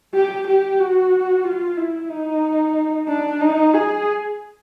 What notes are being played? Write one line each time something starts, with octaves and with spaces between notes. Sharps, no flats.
G4
G4
F#4
F4
E4
D#4
D4
D#4
G#4